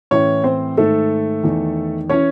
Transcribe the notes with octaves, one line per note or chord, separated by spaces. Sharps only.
A2 E3 C#4 C#5
C4 C5
G#2 D#3 A3 A4
E2 D#3
E3 C#4 C#5